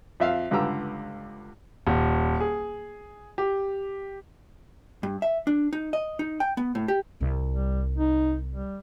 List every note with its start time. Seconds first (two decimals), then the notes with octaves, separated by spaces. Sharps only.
0.20 F2 E5 F5
0.51 C#2 G2 D3 G4 A#5 E6
1.87 D#1
2.40 G#4
3.38 G4
5.03 G2
5.22 E5
5.47 D4
5.73 D#4
5.93 D#5
6.19 D#4
6.40 G5
6.57 B3
6.75 A2
6.88 G4
7.21 C2
7.51 G3
7.97 D#4
8.50 G3